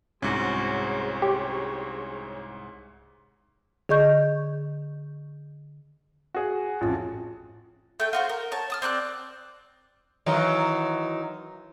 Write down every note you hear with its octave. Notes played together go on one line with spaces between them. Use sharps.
C2 G#2 C#4 F#4 G#4 C5 C#5
G4
D3 G#4 D#5 C#6 G6
F#4 G#4
A1 F2 F4
A3 G5
F4 F#4 C5
A#4
C#5 A5
A5 D#6 F6
C4 D5 C#6 F#6
D#3 E3 F#3